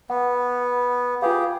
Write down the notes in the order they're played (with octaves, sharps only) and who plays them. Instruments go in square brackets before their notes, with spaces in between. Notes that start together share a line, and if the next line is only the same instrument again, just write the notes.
[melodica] B3 [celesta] F#5
[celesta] F4 B4 F5 [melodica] G4 G#4